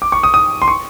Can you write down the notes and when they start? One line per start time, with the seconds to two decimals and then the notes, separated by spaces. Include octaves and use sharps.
0.02 D6
0.12 C#6
0.23 D#6
0.34 D#6
0.62 C6
0.68 C#6